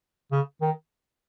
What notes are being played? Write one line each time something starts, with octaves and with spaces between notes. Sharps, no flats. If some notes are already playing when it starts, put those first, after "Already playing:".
C#3
D#3